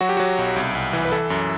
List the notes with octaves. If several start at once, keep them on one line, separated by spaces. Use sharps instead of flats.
F#3 F#4
G4
F#3 F#4
B1
C2
C2
E3
B4
E3 A4
F#2